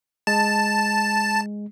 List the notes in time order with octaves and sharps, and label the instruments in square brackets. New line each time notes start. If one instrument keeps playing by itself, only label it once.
[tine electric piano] G#3 [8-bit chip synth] A5